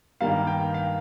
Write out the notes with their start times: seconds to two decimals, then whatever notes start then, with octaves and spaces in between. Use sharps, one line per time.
0.21 G2 D#3 G3 A#3 F5
0.47 G5
0.74 F5